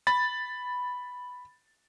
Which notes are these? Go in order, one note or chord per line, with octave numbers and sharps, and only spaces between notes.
B5 A6